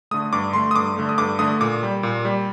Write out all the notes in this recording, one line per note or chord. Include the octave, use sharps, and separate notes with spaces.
D3 A3 D#6
G2 D6
D3 A3 C6
D#6
G2 D6
D3 A3
D#6
G2 D6
D3 A3 D#6
A#2 D6
G3
A#2
G3